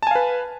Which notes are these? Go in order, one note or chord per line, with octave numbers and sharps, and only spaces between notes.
B4 F5 G#5 A5